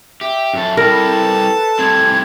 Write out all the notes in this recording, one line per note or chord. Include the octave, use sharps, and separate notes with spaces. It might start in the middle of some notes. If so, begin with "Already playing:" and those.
G4 E5
F#2 A4
G3 E4 A4 A#4
B5
B4
G3 A3 C4 G#6